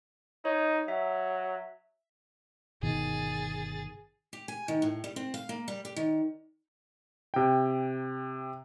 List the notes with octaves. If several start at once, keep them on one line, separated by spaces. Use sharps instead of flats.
D#4 C#5
F#3 E5
G1 B2 D#3 G#4 A6
G4
G#5
D#3
A2
G3
C4
F5
A#3
G3
G4
D#3
C3 G5